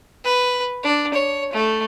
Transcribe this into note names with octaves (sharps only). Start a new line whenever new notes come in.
B4
D4
C#5
A3